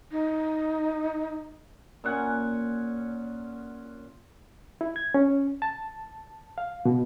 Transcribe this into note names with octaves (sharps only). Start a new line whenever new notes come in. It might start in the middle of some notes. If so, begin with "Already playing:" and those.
D#4
A#2 C#4 F#5 G#5
E4
G#6
C#4
A5
F5
B2